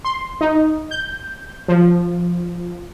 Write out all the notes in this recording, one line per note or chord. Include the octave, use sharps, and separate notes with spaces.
C6
D#4
G6
F3